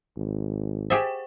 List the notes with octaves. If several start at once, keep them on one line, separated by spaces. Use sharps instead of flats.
G#1
G4 G#4 C5 E5 G5